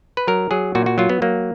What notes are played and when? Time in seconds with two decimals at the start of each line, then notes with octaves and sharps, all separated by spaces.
0.17 B4
0.27 F#3 A#4
0.51 F#3 G#4
0.75 A#2 F#4
0.86 F#4
0.98 F#3 F4
1.09 B3
1.22 F#3 A#3